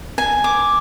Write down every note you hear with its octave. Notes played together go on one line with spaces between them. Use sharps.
G#5
D6